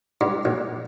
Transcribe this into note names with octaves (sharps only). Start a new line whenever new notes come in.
G2
A#1